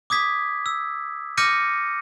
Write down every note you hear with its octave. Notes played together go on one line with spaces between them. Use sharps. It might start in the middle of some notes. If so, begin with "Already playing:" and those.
D6 D#6 G#6 B6
E6
D6 F6 G6 A#6 C#7 D#7